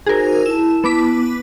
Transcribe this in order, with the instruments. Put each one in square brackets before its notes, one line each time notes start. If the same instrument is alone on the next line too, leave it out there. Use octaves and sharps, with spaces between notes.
[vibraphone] D#4 F#4 C5 [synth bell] G#4 A#4
[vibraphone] E4 A5 [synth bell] E7
[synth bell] B3 D6 B6